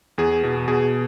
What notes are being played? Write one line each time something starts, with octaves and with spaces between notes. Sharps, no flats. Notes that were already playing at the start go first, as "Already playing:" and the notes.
E2 G#4
B2
B2 G#4